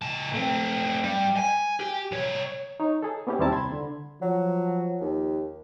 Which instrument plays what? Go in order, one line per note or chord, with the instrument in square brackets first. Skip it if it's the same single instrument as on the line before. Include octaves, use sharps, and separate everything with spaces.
[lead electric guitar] C#2 A5
A3 C4
G2 G3
G#5
G4
C2 C#5
[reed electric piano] D#4 C#5
G#4 A4
A#3 B3 C#4 E4 G4 G#4
D#2 G3 C4 E4 A5 A#5
C2 B5 C6 G#6
D3
[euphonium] F3 [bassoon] F#3
[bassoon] D#2